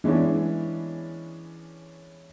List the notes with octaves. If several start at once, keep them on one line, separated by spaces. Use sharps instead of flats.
E3 G#3 B3 C#4 D4